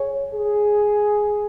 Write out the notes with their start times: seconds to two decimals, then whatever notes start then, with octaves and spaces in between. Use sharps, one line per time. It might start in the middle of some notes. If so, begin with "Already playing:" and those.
Already playing: G#4 C#5
0.33 G#4